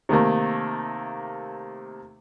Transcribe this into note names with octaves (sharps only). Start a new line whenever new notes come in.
C3 D#3 A3 A#3